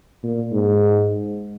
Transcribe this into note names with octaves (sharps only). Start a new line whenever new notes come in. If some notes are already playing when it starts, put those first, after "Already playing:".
A#2
G#2